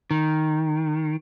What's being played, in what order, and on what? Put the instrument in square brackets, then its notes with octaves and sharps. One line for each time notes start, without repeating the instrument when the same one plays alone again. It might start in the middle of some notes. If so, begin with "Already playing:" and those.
[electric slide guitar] D#3